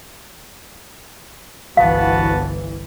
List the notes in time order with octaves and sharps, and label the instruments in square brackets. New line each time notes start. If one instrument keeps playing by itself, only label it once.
[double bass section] G1 C2 E3 [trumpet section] B3 F#4 A5 [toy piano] F5